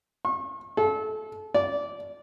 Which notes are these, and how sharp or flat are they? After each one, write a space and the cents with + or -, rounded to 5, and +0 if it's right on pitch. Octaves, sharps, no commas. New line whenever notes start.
C#6 -40
A4 -30
D5 -15